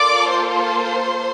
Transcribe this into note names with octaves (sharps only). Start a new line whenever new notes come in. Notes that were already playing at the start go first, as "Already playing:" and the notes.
Already playing: A#3 F4 A4 D5 D6
C5 C6